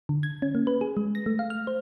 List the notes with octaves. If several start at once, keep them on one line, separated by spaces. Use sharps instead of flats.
D3
G#6
C#4
A#3
B4
G#4
G#3
A#6
A3
F5
F6
C5